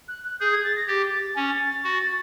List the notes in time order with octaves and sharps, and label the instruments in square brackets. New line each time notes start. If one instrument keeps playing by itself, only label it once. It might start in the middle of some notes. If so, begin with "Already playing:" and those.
[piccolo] F#6
F#6
[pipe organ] G#4 [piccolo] G6
[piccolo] G#6
A6
A#6
[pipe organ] G4 [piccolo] A6
[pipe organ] C#4
F#4